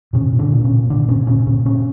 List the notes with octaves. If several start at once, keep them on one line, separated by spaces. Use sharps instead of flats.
A#2 C#3 C#4
A#2
D3 D4
A#2
C#3 C#4
A#2
A#2 D3 D4
A#2 C#3 C#4
A#2 C#3 C#4
A#2 C#3 C#4
A#2 C#3 C#4